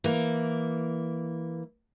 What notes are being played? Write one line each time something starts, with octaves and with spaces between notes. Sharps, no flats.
E3 A#3